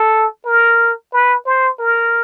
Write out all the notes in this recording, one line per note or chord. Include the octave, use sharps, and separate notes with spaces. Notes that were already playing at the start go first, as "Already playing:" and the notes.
Already playing: A4
A#4
B4
C5
A#4